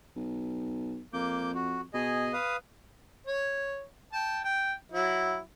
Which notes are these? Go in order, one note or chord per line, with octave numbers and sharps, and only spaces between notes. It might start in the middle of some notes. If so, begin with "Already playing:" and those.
B1
F2 A#3 D6 G6
F#4
B2 G#4 D#5 G#5
B4 F5 D#6
C#5
G5 A5
G5
F#3 E4